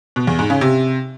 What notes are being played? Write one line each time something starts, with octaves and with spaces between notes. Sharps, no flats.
B2
E2
G#2
C#3
C3